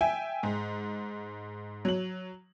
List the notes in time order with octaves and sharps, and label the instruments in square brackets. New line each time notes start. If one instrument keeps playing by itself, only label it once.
[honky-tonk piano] E5 G5 G#5
G#2
F#3 F#7